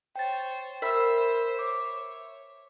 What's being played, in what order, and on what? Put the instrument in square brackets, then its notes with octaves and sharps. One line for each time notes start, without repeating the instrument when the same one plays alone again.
[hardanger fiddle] C5 C#5 [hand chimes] G5 A6
[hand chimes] A#4 B5 [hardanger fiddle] C5 [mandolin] E5
[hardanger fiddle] C#5 [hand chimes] D6